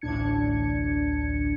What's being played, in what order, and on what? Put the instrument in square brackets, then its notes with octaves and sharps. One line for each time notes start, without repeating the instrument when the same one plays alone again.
[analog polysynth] A1 D2 A2 D4 G#6 C#7